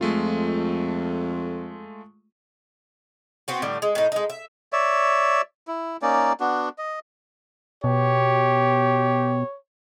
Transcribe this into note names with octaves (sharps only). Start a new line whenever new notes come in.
F2 G#3 A3 F4
B3 C4 F#4
A2 D3 G3
G#3
A2 D#4
G#3 D#4
E5
C#5 D5 E5
E4
A#3 C#4 D#4 D5
B3 D4 F#4
D#5
B2 G4 C#5